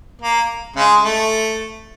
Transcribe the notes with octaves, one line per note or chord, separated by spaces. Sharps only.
A#3
C#3 G#3
A3